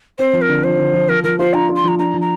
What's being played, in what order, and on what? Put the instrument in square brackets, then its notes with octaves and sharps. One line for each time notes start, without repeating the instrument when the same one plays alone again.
[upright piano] C4 [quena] C5
[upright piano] F3
[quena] A#4
[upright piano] D3
[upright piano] F3 [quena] C5
[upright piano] D3
F3
[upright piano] F3 [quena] A#4
[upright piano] F3 [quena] A#4
[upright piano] F4 [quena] C5
[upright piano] D4 [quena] A#5
[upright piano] F4
[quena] C6
[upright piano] F3 [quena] A#5
[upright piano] D4 [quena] A#5
[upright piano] F3
[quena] A#5